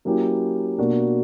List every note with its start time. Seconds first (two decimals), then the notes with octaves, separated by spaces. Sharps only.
0.05 F#3 A#3 C#4 E4 G4
0.78 B2 A#3 D4 F#4